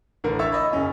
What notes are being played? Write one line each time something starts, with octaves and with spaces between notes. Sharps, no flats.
A1 D3 A#4
C#5 E5 C#6 E6 A6
D#5 B5
F#1 C#4